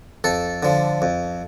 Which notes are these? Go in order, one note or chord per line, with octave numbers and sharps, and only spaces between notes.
F2 A4
D3 F3
F2